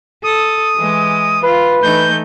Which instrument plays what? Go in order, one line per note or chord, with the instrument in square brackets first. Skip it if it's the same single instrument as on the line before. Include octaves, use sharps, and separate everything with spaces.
[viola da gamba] A4 [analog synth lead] D#6
[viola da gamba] E3 G#3
[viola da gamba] F4 [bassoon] B4
[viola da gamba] E3 A3 D#4 [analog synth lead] G6